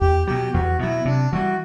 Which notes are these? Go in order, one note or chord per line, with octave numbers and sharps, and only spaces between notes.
E2 G4
B2 F#3 G4
E2 F#4
B2 F#3 E4
C3 D4
E3 G3 F#4